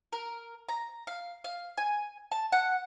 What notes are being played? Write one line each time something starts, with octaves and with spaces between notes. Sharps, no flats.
A#4
A#5
F5
F5
G#5
A5
F#5